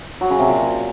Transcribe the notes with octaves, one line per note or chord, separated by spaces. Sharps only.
F#3
C#3
C3
A#2